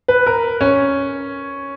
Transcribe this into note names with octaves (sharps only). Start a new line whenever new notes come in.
B4
A#4
C#4